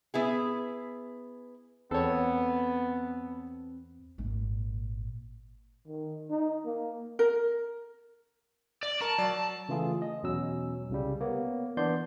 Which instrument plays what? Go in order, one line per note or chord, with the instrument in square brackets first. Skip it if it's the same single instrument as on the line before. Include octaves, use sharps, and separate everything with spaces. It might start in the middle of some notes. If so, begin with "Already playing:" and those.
[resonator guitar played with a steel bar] B3 E4 G#4
[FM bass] E2 [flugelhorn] B3 [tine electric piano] C4 [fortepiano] A4 C#5
[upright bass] G#1 A#2
[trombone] D#3
D#4
A#3
[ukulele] A#4
[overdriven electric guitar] D5
[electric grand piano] A#4 A#5 C#6 [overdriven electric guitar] A5
[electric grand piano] F#3 D5
[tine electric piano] C#3 E3 A3 F4 G#4 A4
D#5
E2 B2 F#3 C#4 E6
C2 C#3 G3
A#3 B3 C#5
E3 B3 D4 D5 C6 G6